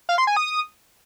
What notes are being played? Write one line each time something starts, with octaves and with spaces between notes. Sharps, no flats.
F5
C6
G#5
D#6